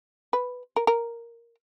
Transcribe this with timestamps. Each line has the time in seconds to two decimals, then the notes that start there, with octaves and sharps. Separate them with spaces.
0.33 B4
0.76 A#4
0.87 A#4